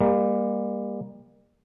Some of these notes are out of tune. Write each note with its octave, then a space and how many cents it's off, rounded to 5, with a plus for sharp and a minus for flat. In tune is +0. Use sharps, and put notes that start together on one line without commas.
G3 +40 A#3 +15